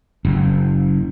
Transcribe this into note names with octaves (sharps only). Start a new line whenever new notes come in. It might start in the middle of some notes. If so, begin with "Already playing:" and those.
F#1